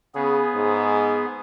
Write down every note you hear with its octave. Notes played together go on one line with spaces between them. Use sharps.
C#3 B3 G#4
G#2